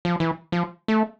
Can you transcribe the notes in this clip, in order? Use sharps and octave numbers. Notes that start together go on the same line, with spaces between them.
F3
E3
F3
A3